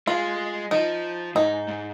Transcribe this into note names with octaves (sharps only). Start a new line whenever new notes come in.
G#3 F4
F3 D#4
G#2 D#4
G#2